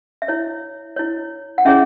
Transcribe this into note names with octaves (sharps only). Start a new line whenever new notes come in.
E5
E4 C#5
E4 C#5
F#5
C#4 E4 G#4 C#5 E5